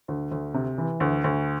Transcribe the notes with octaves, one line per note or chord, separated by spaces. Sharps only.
D2
D2
C3
E3
D2
D2